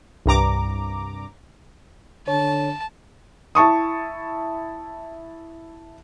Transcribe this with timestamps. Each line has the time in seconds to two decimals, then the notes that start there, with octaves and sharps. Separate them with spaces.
0.26 C2 G2 A#5 D6
2.28 D3 C#5 A5
3.55 E4 A5 C#6 D#6